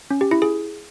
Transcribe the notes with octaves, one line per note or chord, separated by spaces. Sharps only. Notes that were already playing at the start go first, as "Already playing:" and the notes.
C#4
G4
E4
G#4